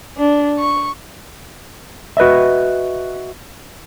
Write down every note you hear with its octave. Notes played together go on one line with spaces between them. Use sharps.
D4
C#6
F#4 B4 D#5 E5